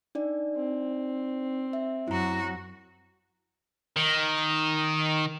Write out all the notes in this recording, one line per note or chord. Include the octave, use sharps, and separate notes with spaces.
D4 D#4 D5
C4
E5
F#2 E4 F#4 A#5
D#3